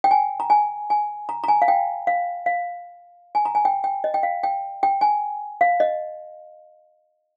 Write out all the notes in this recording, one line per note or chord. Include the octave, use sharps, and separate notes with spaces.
G5
G#5
A#5
G#5
G#5
A#5
A#5
G#5
F5
G5
F5
F5
G#5
A#5
G#5
G5
G5
D#5
G5
F5
G5
G5
G#5
F5
D#5